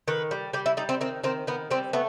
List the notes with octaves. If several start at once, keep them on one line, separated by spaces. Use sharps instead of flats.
D#3 B4
G3
G3 G4
E4
G3 D#4
C4
D#3 C4
D#3 C4
D#3 B3
G3 C4
A3 B3